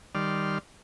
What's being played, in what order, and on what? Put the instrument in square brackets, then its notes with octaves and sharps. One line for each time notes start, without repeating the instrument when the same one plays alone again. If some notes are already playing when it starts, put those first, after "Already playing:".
[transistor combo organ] D#3 G3 D5 C6 F6